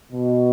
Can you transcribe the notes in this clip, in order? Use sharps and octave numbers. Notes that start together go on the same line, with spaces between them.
B2